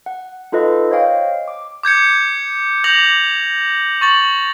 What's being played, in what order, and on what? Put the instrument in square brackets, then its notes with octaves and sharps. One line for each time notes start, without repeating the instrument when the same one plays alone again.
[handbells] F#5
D#4 F4 A4 B4 D#5
C5 C#5 D#5 F5 G5
D6
[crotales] D6 G6 G#6 C#7
D6 G6 A#6 F7 F#7
C#6 A6 F#7